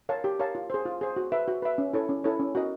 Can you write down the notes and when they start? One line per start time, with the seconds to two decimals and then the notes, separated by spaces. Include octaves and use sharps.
0.09 A#4 C#5 F5 A5
0.24 G4
0.39 A#4 C#5 F5 A5
0.55 F4
0.70 G#4 C5
0.85 F4
1.01 G#4 C5
1.16 F#4
1.32 B4 E5
1.48 F#4
1.62 B4 E5
1.78 C#4
1.93 E4 A4 C#5
2.09 C#4
2.24 E4 A4 C#5
2.40 C#4
2.55 F#4 A#4 D#5